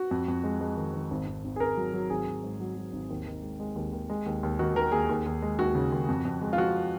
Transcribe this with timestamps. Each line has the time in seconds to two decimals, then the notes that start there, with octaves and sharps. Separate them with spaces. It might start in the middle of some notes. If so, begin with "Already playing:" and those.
Already playing: F#4
0.11 F2
0.28 F2
0.44 G#3
0.61 G#3
0.77 D#3
0.94 D#3
1.11 G#1
1.27 G#1
1.44 G#1
1.56 G#4
1.60 G#1 A#4
1.77 F#3
1.94 F#3
2.10 G#1 G#4
2.27 G#1
2.43 G#2
2.60 F#3
2.76 F#3
2.92 G#1
3.10 D#2
3.26 D#3
3.42 G#3
3.60 G#3
3.75 D#2
3.93 D#2
4.10 G#3
4.26 D#2
4.43 D#2
4.59 D#3 F#4
4.75 D#3 A#4
4.92 D#2 G#4
5.09 D#2
5.26 D#2
5.42 G#3
5.59 D#2 F#4
5.75 C#3
5.92 D#2
6.08 F2
6.25 F2
6.41 G#3
6.53 F4
6.58 F3 F#4